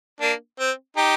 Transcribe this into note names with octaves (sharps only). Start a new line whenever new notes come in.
A#3 D4
C4
D#4 G4